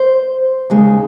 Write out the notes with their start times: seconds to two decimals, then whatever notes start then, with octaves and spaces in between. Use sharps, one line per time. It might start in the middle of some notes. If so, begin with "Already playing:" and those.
Already playing: C5
0.70 D#2 C#3 G#3